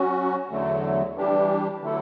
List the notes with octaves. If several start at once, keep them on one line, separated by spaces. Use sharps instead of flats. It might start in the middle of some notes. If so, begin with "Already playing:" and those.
Already playing: F#3 C#4 F#4
E2 D3 F#3 A3
E3 G3 D4 G4
D3 F#3 A3 E4 A4